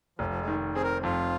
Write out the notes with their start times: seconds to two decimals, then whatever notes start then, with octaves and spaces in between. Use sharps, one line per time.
0.19 F1 F3
0.29 F3
0.41 G#3
0.48 D#3
0.75 C4 G#4
0.83 A#4
1.03 F2 F4